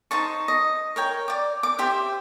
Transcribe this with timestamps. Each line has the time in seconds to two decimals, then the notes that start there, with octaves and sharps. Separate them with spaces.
0.11 D#4 C5 A5 C#6
0.48 D#5
0.96 A#4 C#5 G5
1.28 D5 D6
1.63 D6
1.79 G4 C5 E5 G5